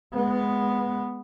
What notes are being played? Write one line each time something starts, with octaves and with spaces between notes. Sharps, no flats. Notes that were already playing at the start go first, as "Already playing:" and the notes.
G#3 B3